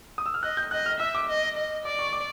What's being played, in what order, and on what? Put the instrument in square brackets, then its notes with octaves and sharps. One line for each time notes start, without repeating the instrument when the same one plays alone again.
[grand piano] D#6
E6
F6
[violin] D#5 [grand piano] F#6
[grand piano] G6
[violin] D#5 [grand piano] F#6
[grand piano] F6
[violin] E5 [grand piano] E6
[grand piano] D6
[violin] D#5
D#5
[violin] D5 [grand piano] D6
[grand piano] C#6
D6